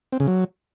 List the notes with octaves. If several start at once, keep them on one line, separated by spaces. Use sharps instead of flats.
C4
C#3
F#3